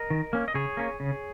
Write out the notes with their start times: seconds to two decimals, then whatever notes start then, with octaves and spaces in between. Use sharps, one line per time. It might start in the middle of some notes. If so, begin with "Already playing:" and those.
Already playing: A#4 D#5
0.10 D#3
0.33 A#3 C#4
0.48 D#5
0.54 C#3 G#4 C#5
0.77 A#3 C#4
1.00 C#3